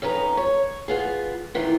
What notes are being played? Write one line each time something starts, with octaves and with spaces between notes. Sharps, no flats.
F2 C#4 D#4 B4 A#5
C#5
B3 F4 G#4
C3 D#3 E3 F4